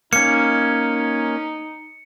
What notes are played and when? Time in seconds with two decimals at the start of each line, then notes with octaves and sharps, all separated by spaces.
0.13 A#3 C#4 D#4 C#7